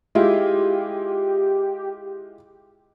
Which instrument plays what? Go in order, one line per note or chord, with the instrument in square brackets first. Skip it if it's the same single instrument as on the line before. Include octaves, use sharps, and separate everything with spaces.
[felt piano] G#3 E4 F4 [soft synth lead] G4